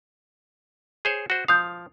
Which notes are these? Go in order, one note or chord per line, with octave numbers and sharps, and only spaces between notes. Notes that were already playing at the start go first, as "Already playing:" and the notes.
G#4 C5 C#5
F#4 C5
F3 F5 D#6 G6